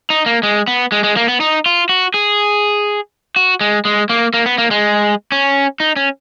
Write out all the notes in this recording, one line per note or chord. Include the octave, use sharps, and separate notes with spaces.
D#4
A#3
G#3
B3
G#3
G#3
A#3
B3
D#4
F4
F#4
G#4
F#4
G#3
G#3
A#3
A#3
B3
A#3
G#3
C#4
D#4
C#4